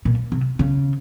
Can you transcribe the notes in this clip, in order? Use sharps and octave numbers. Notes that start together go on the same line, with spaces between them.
A#2
C3
C#3